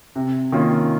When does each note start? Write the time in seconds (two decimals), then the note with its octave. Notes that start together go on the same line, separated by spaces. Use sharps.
0.16 C3
0.52 D#3 A#3 C#4 F4